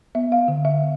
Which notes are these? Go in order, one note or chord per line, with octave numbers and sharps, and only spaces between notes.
B3 E5
F5
D3
E5